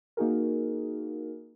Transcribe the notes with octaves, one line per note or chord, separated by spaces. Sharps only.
A#3 D#4 F#4 G#4 A#4